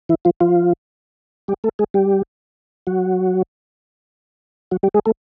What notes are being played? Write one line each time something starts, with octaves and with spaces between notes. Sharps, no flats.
E3 E4
F3 F4
F3 F4
G3 G4
A3 A4
G#3 G#4
G3 G4
F#3 F#4
F#3 F#4
G3 G4
G#3 G#4
A3 A4